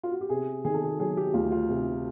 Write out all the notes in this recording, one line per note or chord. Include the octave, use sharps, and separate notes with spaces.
F4
F#4
G4
C3 G#4
D#3 G#4
A4
G#4
F#3 G#4
G4
D2 F4
F4
C3